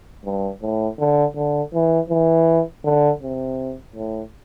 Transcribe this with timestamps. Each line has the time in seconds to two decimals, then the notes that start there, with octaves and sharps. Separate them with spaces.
0.25 G2
0.62 A2
0.99 D3
1.36 D3
1.74 E3
2.10 E3
2.84 D3
3.22 C3
3.95 A2